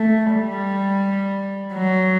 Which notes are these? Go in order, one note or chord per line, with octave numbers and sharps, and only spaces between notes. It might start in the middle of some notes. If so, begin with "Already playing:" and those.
Already playing: A3
G3
F#3